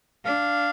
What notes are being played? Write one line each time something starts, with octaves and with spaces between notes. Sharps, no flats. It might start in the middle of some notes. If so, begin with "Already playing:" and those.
D4 F5